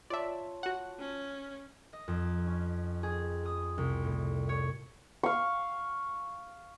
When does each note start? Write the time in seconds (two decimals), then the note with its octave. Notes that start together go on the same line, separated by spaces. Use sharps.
0.10 F4 C#5 D5 E5 A5
0.63 F#4 F#5
0.99 C#4
1.93 D#5
2.08 F2
2.47 C#4
3.03 G#4
3.45 D#6
3.78 C2
4.04 A2
4.49 C#5
5.23 F5 C#6